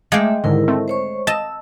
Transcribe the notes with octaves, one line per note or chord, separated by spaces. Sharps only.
G#3 A3 E5 F5 G5 D6 G#6
G#2 D3 D#3 E4 A#4
A3 C4
C5 C#5 C#6
D#5 A5 E6